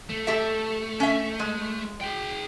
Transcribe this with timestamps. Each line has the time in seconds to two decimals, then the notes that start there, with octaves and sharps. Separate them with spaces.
0.09 A3
0.27 G4 A4 E5
1.00 C#4 E5
1.39 G#3
2.01 G#4 G5